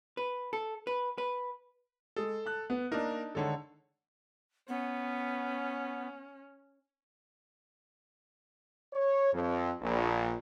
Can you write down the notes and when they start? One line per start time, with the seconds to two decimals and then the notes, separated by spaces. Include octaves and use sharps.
0.17 B4
0.53 A4
0.87 B4
1.18 B4
2.16 G#3 G#4 A4
2.46 A5 F#6
2.70 B3
2.91 A#3 D4 D#4 A#4
3.35 D3 D#3 G#3 A4 C#5 A5
4.68 B3 C#4
8.93 C#5
9.33 F2
9.82 A#1